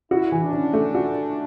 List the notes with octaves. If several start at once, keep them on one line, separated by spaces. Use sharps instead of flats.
E4 F#4
E3
D4
C#4
A3
F#4